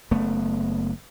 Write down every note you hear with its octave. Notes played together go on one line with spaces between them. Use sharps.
F#1 A3 B3